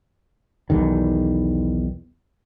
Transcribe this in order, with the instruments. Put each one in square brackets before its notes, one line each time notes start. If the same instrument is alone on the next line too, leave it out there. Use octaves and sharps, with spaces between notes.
[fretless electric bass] B1 E2 D#3